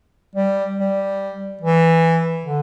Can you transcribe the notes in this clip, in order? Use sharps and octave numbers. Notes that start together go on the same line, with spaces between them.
G3
G3
E3
D3